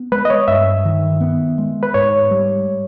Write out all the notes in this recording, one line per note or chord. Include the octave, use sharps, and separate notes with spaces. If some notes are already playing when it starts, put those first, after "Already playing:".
Already playing: B3
G#3 B4
D#5
C#5
G2 E5
D#3
B3
G#3
B4
G#2 C#5
G3